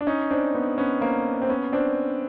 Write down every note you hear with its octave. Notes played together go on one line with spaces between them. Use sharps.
D4
C#4 D#4
C4 D4
B3 C#4
B3 C#4
A#3 C4
C4
B3 C#4
C4 D4